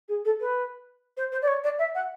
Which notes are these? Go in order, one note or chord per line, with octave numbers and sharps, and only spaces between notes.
G#4
A4
B4
C5
C5
D5
C#5
D5
E5
F#5